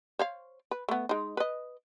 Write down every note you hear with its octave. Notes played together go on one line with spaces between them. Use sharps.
C5 C#5 F5
B4
A3 B3
G#3 D#4
B4 D#5